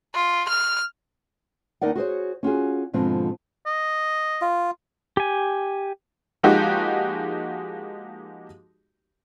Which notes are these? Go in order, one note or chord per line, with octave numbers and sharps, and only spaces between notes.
F4
F6
D#2 D#4 A#4 D5 F#5
F#4 G#4 C5 C#5
C#4 F4 F#4 G#4
G#2 B2 D3 F3 C4 F4
D#5
F4
G4 G#5
F3 G#3 A#3 D#4 F#4 G4